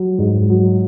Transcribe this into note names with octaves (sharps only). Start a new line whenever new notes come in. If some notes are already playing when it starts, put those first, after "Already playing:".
Already playing: F#3
G#2
F#3